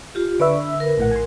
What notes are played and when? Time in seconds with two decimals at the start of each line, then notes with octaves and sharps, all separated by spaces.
0.15 F4 G4
0.40 D3 B4 D5 E5 C#6
0.61 E6
0.80 A#4
0.98 A#1 A2 F#5
1.11 G#5 C6